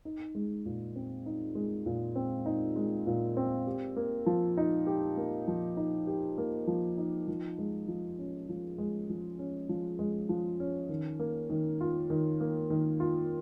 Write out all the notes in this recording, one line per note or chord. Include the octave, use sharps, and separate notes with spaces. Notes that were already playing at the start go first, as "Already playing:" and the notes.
D#4
G#3
A#2
C4
D#4
G#3
A#2
C4
D#4
G#3
A#2
C4
G4
A#3
F3
D#4
G4
A#3
F3
D#4
G4
A#3
F3
D#4
F3
G#3
F3
C#4
F3
G#3
F3
C#4
F3
G#3
F3
C#4
D#3
A#3
D#3
F4
D#3
A#3
D#3
F4